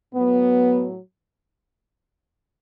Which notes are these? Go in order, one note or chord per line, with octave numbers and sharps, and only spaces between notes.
A2 F#3 B3